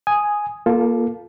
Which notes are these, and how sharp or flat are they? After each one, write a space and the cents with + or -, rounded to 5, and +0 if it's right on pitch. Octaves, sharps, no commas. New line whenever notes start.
G#5 +0 D#6 +0
A#3 +20 F4 +0 A4 -15